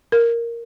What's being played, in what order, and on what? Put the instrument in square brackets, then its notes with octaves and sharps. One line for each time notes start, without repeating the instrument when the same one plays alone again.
[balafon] A#4